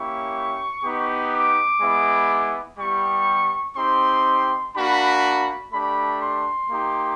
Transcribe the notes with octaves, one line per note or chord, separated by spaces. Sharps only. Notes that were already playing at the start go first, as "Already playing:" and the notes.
Already playing: A#3 C#4 E4 G4 C#6
B3 D#4 G4
D6
G#3 B3 E4
G3 B3 E4 G4 C#6
C4 D#4 G4 C6
A#3 D4 F#4 B5
A3 D4 G4 B5
C6
A#3 D#4 G4